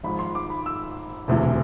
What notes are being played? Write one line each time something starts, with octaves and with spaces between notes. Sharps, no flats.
G#1 G#2 F3 B5
C6
D6
B5
E6
E1 D2 C3 E3